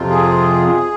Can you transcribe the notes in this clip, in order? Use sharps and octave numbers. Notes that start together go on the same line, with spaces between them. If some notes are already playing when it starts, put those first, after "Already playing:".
Already playing: F2 C3 F3 C4 F4
G#4